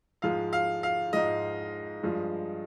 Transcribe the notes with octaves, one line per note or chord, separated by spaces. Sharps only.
G#2 F3 G#3 F5
F5
F5
G#2 F3 G#3 D#5
G2 F3 G#3